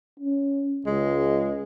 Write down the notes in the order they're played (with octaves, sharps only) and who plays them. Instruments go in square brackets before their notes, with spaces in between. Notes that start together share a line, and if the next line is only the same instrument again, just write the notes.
[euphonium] C#4
[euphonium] C#2 [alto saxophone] G#3